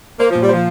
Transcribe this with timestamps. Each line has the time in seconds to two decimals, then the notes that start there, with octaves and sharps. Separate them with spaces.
0.20 A#3 C5
0.31 A#2 F3
0.42 G3
0.49 F3 C5